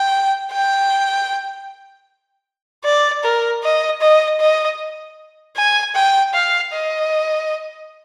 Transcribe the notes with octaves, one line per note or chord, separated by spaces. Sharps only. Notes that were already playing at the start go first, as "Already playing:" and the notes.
Already playing: G5
G5
D5
A#4
D#5
D#5
D#5
G#5
G5
F5
D#5